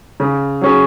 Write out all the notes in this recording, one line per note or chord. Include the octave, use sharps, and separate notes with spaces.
C#3
F#3 C#4 G#4